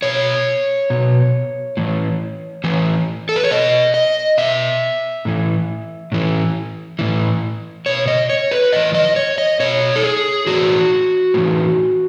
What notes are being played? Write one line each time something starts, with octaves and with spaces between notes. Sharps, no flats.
B2 C#5
B2
A2 E3
A2 E3
A4
B4
C#5
B2 D#5
D#5
B2 E5
A2 E3
A2 E3
A2 E3
B2 C#5
D#5
C#5
B4
A2 E3 D#5
D#5
C#5
D#5
B2 C#5
A4
G#4
A2 E3 F#4
A2 E3